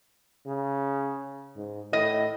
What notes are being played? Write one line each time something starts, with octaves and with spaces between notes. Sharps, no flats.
C#3
G#2
A2 D#5